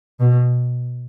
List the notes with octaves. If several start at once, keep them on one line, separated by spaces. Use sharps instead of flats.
B2